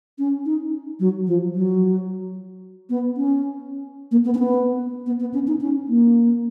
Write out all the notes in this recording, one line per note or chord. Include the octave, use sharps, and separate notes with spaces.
C#4
D#4
F#3
F3
F#3
B3
C#4
A#3
B3
C#4
B3
B3
B3
C#4
D#4
C#4
A#3